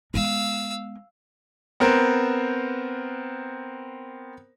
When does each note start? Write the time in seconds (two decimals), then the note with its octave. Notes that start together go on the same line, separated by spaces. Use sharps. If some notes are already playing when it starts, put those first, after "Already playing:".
0.14 G#3 B3 F5 E6
1.80 B3 C4 A#4 C5